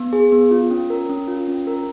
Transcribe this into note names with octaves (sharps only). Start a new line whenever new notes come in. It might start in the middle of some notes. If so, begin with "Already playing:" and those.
Already playing: B3
G#4
B3
F4
C#4
A#4
C#4
F4
C#4
A#4